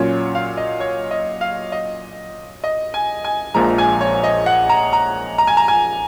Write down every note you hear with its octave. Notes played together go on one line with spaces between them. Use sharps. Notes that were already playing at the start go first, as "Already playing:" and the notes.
Already playing: A#2 F#3 C#4 F4 C#5
F5
D#5
C#5
D#5
F5
D#5
D#5
G#5
G#5
A#1 A#2 F3 G#3 A#5
G#5
C#5
D#5
F#5
A#5
A#5
A#5
G#5
A#5
G#5